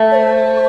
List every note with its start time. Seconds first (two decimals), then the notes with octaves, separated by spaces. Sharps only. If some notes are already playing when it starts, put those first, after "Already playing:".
Already playing: A3
0.11 C#5
0.15 C5